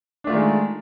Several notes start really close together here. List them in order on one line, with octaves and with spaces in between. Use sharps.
D4 A3 F4 D#3 G#3